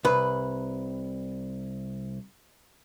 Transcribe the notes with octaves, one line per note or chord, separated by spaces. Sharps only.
C2 B4